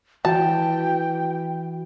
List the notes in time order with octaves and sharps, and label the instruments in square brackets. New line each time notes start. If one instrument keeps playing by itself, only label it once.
[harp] E3 [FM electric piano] F#4 [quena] G5 [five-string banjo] A5